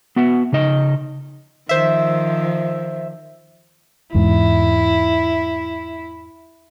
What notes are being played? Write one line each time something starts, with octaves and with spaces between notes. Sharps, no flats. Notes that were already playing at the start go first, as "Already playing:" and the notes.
B3 F#4 E5 F#5
C#3 D#4 D#5
D#3 F3 C5 E5
E2 G#2 E4